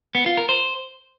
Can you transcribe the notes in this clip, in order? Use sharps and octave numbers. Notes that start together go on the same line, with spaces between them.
B3
F4
A#4
C5